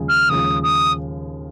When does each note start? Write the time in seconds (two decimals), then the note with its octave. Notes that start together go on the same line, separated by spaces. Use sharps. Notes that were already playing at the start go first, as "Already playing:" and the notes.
Already playing: D#2 C#3 F3 G#3
0.08 F6
0.29 D#2 C#3 F3 G#3 D#6
0.63 D#6